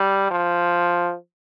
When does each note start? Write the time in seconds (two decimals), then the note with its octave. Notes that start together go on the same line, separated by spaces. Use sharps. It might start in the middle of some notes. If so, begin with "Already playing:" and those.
Already playing: G3
0.31 F3